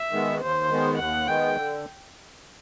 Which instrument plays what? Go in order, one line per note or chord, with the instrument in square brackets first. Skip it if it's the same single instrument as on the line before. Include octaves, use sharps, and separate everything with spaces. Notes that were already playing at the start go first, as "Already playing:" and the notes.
Already playing: [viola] E5
[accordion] D#3 G#3 B3
[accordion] D#2 [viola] C5
[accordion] D#3 G#3 B3
[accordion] D#2 [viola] F#5
[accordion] D#3 G#3 B3 [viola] G5
[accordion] D3